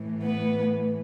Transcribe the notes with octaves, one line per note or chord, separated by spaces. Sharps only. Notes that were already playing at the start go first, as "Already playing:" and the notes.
Already playing: A2 E3
B3 B4